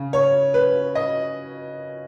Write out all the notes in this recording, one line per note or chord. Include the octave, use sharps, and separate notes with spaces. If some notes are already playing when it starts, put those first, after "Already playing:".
Already playing: C#3
C#5
B4
D#5